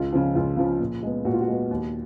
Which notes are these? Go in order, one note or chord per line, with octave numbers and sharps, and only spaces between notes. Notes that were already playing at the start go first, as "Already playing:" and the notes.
Already playing: C#2 F4
C#3 F3
C#2 F4
C#3 F3
A#2
G#3 B3
A#2 F#4
F4
F#4
G#3 B3
D#2